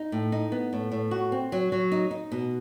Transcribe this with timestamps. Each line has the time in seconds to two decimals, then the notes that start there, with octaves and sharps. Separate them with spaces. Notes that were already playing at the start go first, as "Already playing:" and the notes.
Already playing: D#4
0.12 A2
0.32 D#4
0.52 B3
0.73 A2
0.92 A2
1.11 F#4
1.32 C4
1.52 F#3
1.72 F#3
1.92 D#4
2.11 D#4
2.32 B2